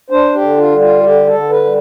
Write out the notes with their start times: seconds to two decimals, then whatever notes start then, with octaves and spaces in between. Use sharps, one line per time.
0.10 D4 C5
0.34 G4
0.41 D3
0.57 F4
0.72 G3
0.80 F4
1.03 D3 G4
1.26 A4
1.34 D3
1.50 B4
1.64 G3